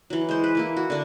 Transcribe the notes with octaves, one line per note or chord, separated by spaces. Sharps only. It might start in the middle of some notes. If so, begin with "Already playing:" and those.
E3 F#3
G#3 C5
B4
E3 A#3 E4
F#4
D3 D4